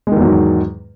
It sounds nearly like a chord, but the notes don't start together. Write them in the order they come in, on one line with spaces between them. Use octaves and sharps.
G#3 D#3 E2 F#3 G#2